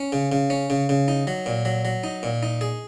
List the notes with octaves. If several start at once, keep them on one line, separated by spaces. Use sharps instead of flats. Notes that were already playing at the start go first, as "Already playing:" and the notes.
Already playing: C#4
C#3
C#3
C#4
C#3
C#3
D#4
F#3
A#2
F#3
F#3
D#4
A#2
D#4
G#4